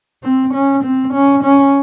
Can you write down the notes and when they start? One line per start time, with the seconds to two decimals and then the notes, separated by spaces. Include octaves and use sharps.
0.24 C4
0.54 C#4
0.84 C4
1.14 C#4
1.44 C#4